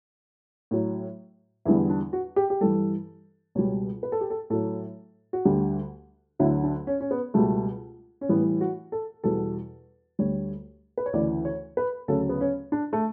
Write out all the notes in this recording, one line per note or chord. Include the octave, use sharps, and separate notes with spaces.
A2 F#3
E2 D3 G3 E4
D4
F#4
G4
G4
G2 E3 G3 A4
C#2 B2 G3 C#5
B4
A4
G4
A4
A2 F#3 A4
F#4
D2 D3 G3 G4
D2 D3 F#3 E4
D4
C#4
C#4
B3
C#2 B2 G3 A3
C#4
A2 E3 G3 B3
F#4
A4
E2 B2 G3 A4
D2 D3 G3 C#5
B4
C#5
D2 C#3 E3 D5
C#5
B4
D2 C#3 F#3 A4
B3
C#4
D4
A3